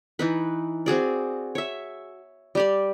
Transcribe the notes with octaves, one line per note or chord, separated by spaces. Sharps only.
E3 D#4 B4
C4 F#4 G#4 D5
C#5 E5
G3 G4 D5